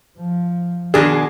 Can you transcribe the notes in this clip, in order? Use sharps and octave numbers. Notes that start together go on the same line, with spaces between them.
F3
B2 D#3 D4 G#4